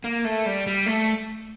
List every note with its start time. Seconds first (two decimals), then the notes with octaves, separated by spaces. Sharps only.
0.04 A#3
0.25 A3
0.46 G3
0.67 G3
0.87 A3